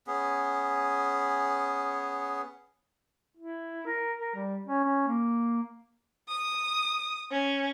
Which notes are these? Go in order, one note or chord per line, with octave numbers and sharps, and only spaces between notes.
B3 C#4 G#4
E4
A#4
A#4
G3
C#4
C#4
A#3
D#6
C#4